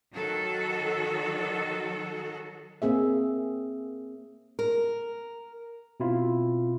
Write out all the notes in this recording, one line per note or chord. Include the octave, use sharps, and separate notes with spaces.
D#3 F#3 F#4 A4
A#3 C4 G#4 E5
A#4
B2 C4 E4 F4